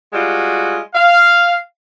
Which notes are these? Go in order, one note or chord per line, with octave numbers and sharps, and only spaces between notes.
G3 G#3 F4 F#4
F5